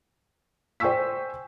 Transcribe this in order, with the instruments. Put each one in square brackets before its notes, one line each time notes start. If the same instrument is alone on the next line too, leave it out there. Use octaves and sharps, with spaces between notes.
[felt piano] C5 G5 G#5 C#6 E6 B6